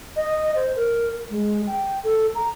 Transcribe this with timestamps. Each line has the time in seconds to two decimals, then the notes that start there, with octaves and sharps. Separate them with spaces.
0.16 D#5
0.55 C5
0.76 A#4
1.30 G#3
1.67 G5
2.04 A4
2.35 A#5